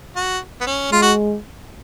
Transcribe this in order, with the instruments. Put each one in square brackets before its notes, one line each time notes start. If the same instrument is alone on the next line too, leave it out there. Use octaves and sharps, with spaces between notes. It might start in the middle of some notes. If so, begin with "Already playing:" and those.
[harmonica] F#4
B3
C#4
[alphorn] G#3 [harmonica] F4
[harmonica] F#4